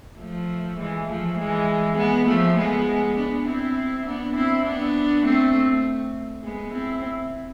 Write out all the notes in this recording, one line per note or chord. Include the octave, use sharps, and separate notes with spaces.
F3 A3
E3 G#3
F3 A3
E3 G#3
G#3 B3
F3 A3
G#3 B3
B3 D4
C4 E4
B3 D4
C4 E4
B3 D4
A3 C4
G#3 B3
C4 E4